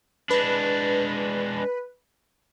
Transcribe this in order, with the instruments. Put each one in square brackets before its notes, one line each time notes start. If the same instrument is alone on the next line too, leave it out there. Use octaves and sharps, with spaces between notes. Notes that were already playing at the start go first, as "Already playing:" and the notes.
[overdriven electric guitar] G#3 D4 [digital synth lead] B4